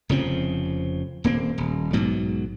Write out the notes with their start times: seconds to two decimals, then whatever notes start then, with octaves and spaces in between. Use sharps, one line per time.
0.09 F1 C#3 F3 C4
1.24 D#1 A#3 C4
1.58 D#1
1.93 B1 G#2 B2 F#3